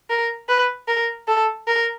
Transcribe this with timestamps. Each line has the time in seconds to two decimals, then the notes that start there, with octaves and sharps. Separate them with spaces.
0.10 A#4
0.49 B4
0.88 A#4
1.28 A4
1.67 A#4